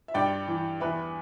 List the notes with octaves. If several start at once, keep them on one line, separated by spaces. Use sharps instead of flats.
E5
G2 D5 G5
E3
E2 B4 E5